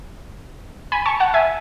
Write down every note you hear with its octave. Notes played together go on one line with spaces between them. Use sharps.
G#5 B5
A5 C#6
F#5 A5
E5 G#5